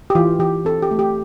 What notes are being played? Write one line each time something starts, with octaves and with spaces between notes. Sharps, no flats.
G4
E3 F4
E3 G4
C4 A4
G4
A3
G4